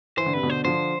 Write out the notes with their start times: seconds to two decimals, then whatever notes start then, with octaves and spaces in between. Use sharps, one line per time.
0.17 E3 C5
0.26 D3
0.34 C3 B4
0.43 B2 D3
0.50 C5
0.65 D3 F3 C5